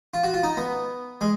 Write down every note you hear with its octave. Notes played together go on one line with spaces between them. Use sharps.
F4
F#4
F4
D#4
B3
G#3